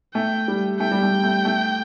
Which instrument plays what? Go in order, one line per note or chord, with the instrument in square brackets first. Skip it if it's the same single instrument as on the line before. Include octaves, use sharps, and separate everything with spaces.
[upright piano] A3 [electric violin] G5
[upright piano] G3
[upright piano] A3 [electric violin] G5
[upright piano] G3
A3
A3
A3